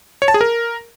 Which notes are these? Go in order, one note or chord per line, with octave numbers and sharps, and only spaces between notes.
C#5
A5
G#4
A#4